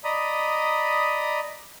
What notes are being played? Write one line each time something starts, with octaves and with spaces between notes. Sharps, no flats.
D5 D#5 A#5 B5 D#6